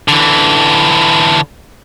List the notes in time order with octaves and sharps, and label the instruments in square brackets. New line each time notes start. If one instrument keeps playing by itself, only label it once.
[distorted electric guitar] D3 E3